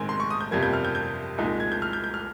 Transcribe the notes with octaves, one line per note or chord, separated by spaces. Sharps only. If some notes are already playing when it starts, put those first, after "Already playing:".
Already playing: A#1 G#2 D#3 G#3 C4 G#5
C6
C#6
D#6
G6
G1 F2 C3 G3 A#3 G#6
G6
F6
G6
G6
C2 A#2 G#3 D#4
G#6
G6
F6
G6
G6
F6